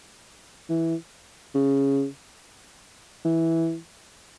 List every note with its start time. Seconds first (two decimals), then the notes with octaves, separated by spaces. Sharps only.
0.70 E3
1.55 C#3
3.25 E3